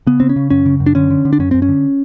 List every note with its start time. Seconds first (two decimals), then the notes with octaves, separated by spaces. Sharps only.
0.07 C#3 B3
0.20 C#3 C4
0.29 C#4
0.36 C#3
0.50 F#2 C#4
0.66 C#3
0.80 F#2
0.86 D4
0.95 D3 C#4
1.10 D3
1.25 D3
1.33 D4
1.39 F#2 C#4
1.51 F#2 C4
1.62 C#4
1.69 D3